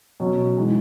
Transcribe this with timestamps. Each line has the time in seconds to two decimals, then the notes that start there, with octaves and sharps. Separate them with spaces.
0.20 B2 F#3 C#4
0.57 E3 G#3 D#4